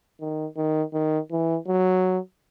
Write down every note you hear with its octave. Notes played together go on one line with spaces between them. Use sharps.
D#3
D#3
D#3
E3
F#3